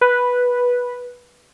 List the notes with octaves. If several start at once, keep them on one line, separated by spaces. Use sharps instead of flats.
B4